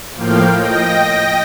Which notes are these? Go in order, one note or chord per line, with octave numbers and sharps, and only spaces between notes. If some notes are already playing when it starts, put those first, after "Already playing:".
A2 F3 A#3 F5 G5
D#5 G5 A#6